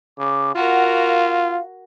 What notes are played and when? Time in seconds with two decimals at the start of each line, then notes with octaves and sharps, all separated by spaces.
0.18 C#3 D6
0.56 F4 F#4 A#4 F#5
0.94 F5